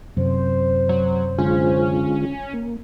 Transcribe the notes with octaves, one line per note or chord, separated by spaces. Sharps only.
F#2 C3 C5
F#3
D3 G#3 C#4 F4
A#3